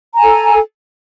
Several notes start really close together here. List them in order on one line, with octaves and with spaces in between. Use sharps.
A#5 G#5 A4